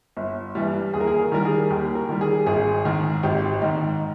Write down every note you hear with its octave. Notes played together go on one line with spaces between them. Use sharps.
G1
G2 E3 G3
D#2 G#4
A#4
G#4
A#4
D#3 G3 A#4
G#4
D#2 G4
A#4
D#3 G3
G#4
G#1 G#4
G#2 D#3
G#1 G4
G#2 D#3 D#4